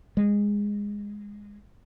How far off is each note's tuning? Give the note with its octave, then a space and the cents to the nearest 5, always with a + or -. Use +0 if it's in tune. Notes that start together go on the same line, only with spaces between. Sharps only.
G#3 -15